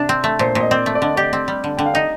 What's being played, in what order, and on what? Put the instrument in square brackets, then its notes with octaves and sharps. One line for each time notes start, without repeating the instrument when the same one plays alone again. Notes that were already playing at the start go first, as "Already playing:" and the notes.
Already playing: [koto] C3 D4
C4
A3
[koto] A#2 [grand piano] C5
[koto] A#2
[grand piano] D#5
[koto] C4 [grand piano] D5
[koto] A3
[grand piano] D5
[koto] D3 [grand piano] D#5
[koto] G4 [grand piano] D5
[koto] C4
G3
D3
[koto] D3 [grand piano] G5
[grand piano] F5
[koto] D#4 [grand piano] D#5